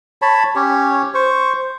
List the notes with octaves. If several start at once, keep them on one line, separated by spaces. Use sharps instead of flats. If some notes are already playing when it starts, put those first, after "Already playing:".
C#5 A5 B5
C#4 G4 C#5
C5 C#6